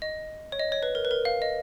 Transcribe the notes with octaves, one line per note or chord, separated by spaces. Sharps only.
D#5
C#5
D#5
C#5
B4
A#4
B4
A#4
F5
D#5